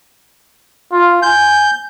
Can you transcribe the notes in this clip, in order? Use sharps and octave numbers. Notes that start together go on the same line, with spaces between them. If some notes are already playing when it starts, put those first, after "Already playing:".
F4
G#5 G6